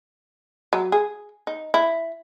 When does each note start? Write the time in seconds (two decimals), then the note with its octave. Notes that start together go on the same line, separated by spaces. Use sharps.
0.73 F#3
0.92 G#4
1.47 D#4
1.74 E4